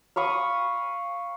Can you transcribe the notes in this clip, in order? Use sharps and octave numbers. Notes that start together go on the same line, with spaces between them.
F5 B5 C#6 D#6